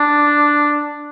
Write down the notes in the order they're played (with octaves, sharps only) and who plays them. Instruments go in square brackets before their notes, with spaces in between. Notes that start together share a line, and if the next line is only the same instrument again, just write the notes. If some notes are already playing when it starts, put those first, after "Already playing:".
Already playing: [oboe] D4